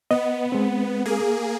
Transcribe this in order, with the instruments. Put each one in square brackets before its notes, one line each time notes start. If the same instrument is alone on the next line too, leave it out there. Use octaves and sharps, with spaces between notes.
[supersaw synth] B3 [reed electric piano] D#5
[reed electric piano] G#3 C4
[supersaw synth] A#3 G#4